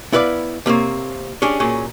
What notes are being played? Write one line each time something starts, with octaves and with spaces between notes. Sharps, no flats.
B3 E4 B4 C5 D5 F5
C3 A#3 C4 C#5
C#4 D4 G4 G#4
A#2 F#3 C#4 G#4